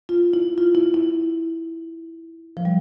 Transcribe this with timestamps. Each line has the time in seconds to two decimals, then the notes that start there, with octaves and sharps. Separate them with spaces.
0.09 F4
0.33 E4
0.58 F4
0.75 E4
0.94 E4
2.57 F3
2.65 G3